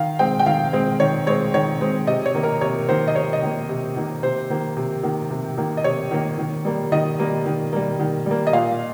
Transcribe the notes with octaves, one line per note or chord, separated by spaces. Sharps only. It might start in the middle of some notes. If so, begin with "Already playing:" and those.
Already playing: D#3 F5
G#3 C4 G5
G5
D#3 F5
G#3 C4
D#3 C#5
G#3 C4 C#5
D#3 C#5
G#3 C4
C3 D#5
C#5
D#3 A#3
A#4
C3 C#5
D#3 A#3 C5
D#5
C3 C#5
D#5
D#3 A#3
C3
D#3 A#3
C3 C5
D#3 A#3
C3
D#3 A#3
C3
D#3 A#3
D#5
C3 C#5
D#3 A#3
D#3
G3 A#3
D#3 D#5
G3 A#3
D#3
G3 A#3
D#3
G3 A#3
D#5
A#2 F5